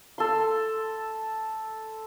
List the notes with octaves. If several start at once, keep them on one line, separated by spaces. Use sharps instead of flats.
A4 C6